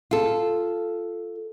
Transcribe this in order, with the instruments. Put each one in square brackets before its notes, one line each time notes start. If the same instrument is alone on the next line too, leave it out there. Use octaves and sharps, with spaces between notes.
[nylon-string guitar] F4 A4